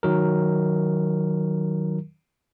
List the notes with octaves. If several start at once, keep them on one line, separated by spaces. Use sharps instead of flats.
D#3 F#3 A#4